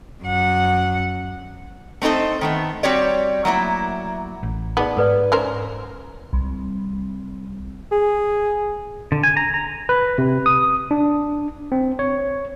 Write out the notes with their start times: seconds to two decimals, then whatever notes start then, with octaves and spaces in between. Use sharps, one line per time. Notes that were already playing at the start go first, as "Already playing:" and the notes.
0.23 F#2 F#5
2.02 A3 C4 D#4 A4 C5
2.41 D#3 A3 B3
2.83 G3 C4 F#4 G4 C#5 D5
3.45 F#3 A3 A#3 E4
4.43 A1
4.77 B3 D#4 G#4 D5
4.97 G#2 A4 B4 D5
5.32 C#4 A#4 C5
6.33 C2
7.91 G#4
9.12 D3
9.23 G#5
9.37 A#5
9.54 A#5
9.89 B4
10.18 C3
10.46 D#6
10.91 D4
11.72 C4
11.99 C#5